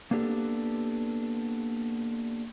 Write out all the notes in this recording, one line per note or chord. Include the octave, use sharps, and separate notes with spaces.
A#3 B3 D4 G4 A4